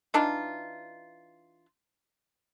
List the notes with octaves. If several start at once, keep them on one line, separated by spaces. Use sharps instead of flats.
E3 D4 D#4 F4